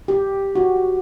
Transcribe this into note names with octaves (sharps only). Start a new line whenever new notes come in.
G4
F#4